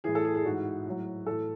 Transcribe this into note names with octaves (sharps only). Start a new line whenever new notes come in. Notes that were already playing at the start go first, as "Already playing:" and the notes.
A2 E3 G#4
A4
G#4
G#4
G#2 E3 F#4
A2 F#3
A2 E3 A4